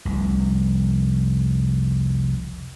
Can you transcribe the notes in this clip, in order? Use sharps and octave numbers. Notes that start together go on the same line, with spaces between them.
F1 C2